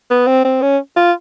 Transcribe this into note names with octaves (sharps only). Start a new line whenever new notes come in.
B3
C4
C4
C#4
F4